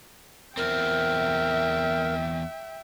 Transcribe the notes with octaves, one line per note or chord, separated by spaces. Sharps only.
E2 C4 A#4 E5 G5